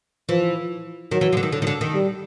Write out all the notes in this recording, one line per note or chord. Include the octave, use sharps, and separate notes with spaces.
E3 F3
D#3 F#3
E3
F3
D3
D#3
D3
D#3
D3
D#3
G3